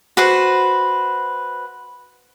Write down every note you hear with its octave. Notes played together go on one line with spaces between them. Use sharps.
F#4 B4 C5